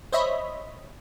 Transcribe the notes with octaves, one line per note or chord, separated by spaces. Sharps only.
C5 C#5 D#5 E5 B5